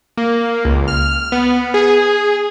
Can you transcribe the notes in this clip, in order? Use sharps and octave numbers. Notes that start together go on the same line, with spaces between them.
A#3
C#2
F6
B3
G#4